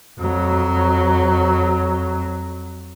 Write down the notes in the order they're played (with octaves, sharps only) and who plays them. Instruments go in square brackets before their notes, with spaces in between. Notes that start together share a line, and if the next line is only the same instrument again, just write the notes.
[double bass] F2 F#3